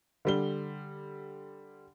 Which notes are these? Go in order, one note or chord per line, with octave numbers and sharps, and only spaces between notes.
D3 G3 G7